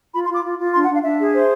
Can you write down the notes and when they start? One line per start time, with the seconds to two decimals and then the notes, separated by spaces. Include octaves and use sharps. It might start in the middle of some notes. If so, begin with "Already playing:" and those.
0.14 F4 B5
0.24 C6
0.29 F4 D6
0.44 F4
0.59 F4
0.74 D4 C6
0.84 F#5
0.89 D4 F5
1.04 D4 E5
1.19 G#4
1.34 C5